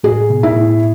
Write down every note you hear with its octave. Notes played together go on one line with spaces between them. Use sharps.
A2 G#4
B2
E4
A2